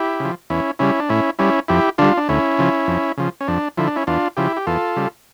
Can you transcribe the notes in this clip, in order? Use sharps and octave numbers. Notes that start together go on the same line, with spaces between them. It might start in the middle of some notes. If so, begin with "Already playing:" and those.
Already playing: E4 G4
C#3 F3
E2 C#4 E4
C#3 G3 C#4 E4
D4
A2 C#4 E4
G3 C#4 E4
F2 E4 G4
D3 G3 D4 F4
D4
D2 C#4 E4
C#3 F3
F2
C#3 F3
C#4
F2 D4
D3 F3 E4
D4
C#4 E4
E2 D4 F4
C#3 F3 E4 G4
G4
E2 F4 A4
C#3 G3